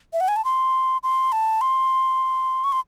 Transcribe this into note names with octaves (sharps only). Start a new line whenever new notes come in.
E5
F#5
G#5
A5
C6
C6
A5
C6
C#6
C6